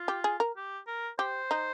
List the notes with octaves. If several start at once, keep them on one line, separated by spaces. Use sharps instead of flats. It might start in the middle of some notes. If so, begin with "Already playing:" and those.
Already playing: F4
G4
G#4
A#4
G4
A#4
G4 C5
D#4